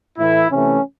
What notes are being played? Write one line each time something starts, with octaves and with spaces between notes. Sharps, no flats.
A2 E3 A3 E4
C3 E3 A3 C#4